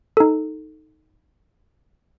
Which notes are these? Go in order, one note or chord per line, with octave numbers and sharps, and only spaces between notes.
D#4 A4